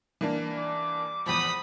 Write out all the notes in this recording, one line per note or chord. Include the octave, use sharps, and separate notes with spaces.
E3 A#3 D4
G3 D6
E2 F3 B5 D#6